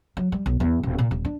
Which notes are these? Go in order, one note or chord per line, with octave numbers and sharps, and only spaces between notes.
F#3
G3
B1
E2
D#1
A#2
D#1
D4